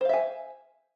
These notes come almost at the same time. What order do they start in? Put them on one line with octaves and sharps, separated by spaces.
C5 F5 E5 G#5